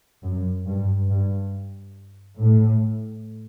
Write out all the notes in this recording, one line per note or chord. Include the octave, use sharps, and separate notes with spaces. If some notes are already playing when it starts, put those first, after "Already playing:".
F#2
G2
G2
A2